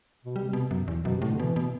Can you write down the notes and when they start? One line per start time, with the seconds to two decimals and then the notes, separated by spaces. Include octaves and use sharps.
0.25 B2
0.36 C3 G3
0.53 B2
0.71 F#2
0.88 E2
1.04 F#2 B2
1.16 C3
1.22 A2
1.28 D3
1.39 B2 E3
1.56 B2